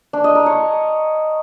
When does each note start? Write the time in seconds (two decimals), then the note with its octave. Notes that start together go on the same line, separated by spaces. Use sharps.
0.13 D4
0.24 D#5
0.35 A#4
0.46 C#5